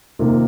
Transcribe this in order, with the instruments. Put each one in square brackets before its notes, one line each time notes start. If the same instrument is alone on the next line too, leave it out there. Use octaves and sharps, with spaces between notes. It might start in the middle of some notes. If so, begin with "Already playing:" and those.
[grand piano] C3 D#3 A#3 F4